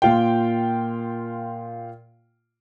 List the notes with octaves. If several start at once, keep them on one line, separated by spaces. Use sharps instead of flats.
A#2 F4 G5